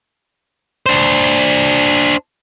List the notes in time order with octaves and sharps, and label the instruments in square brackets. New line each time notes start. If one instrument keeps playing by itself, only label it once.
[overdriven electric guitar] D4 C5